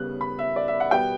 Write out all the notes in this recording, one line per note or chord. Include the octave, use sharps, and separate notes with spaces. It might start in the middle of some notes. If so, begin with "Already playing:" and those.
Already playing: C#3 G3 B3 F#6
B5
E5
D5
E5
F#5
B2 G3 B3 G5